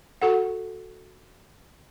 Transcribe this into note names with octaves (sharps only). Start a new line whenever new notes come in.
F#4 A4 F#5